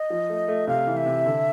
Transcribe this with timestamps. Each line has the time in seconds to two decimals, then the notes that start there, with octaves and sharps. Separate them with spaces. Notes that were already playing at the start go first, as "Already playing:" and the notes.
Already playing: D#5
0.10 F3
0.29 A3
0.48 A3
0.67 C3 F5
0.87 E3
0.97 E5
1.06 C3
1.26 D3